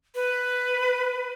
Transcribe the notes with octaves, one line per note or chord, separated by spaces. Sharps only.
B4